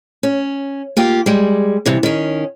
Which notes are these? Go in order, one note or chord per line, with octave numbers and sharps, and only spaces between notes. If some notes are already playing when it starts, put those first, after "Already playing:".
C#4
A#3 F4 G4
G3 G#3
G2 C3 E3
D#3 C#4